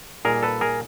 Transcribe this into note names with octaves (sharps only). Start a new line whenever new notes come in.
A#2 G3 A#3 D#4 G#4 A#4
A4 B4
G#4 A#4